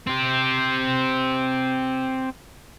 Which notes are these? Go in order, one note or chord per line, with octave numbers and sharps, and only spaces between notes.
C4 G4